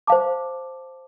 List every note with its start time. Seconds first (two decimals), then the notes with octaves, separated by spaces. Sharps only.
0.07 C5 F5 A5 D6